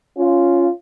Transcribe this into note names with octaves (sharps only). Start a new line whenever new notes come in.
C#4 F4